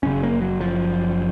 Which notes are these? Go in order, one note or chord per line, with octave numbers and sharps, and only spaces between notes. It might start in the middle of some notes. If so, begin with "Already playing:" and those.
F#1 F#2 C#3 C#4
A#3
F#3
F3